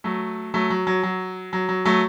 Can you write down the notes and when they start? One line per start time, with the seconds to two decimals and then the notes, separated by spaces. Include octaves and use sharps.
0.04 F#3 A3
0.54 F#3 A3
0.70 F#3
0.87 F#3
1.03 F#3
1.53 F#3
1.69 F#3
1.85 F#3 A3